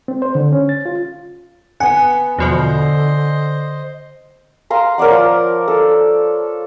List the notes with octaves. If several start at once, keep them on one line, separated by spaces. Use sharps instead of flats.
C4
C5
D3
C#4
A6
F4
B3 F#5 G#5
E2 B2 D3 F3 C5 D#5
F5 A#5 C6
A#4 C#5 D5 F#5
F3
A4